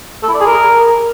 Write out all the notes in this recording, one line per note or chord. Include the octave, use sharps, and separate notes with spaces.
A4
E4
D5
G#4
A#4